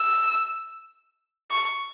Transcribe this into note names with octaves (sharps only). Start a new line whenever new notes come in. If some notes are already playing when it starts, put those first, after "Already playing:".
Already playing: E6
C#6